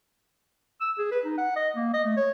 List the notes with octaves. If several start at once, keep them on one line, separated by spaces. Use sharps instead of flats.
E6
G#4
B4
D#4
F#5
D#5
A#3
D#5
A3
C#5